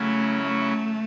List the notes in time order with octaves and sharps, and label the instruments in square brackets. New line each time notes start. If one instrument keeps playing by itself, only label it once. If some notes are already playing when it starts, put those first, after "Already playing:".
Already playing: [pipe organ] C#3 F#3 C#4 E4 [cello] A3
[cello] A3